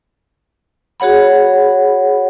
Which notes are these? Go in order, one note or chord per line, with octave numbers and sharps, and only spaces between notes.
F#4 G#4 C#5 F#5 B5